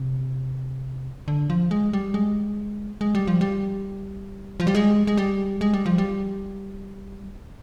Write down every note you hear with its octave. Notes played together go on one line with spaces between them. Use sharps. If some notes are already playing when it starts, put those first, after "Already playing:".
Already playing: C3
D3
F3
G#3
G3
G#3
G#3
G3
F3
G3
F3
G3
G#3
G#3
G3
G#3
G3
F3
G3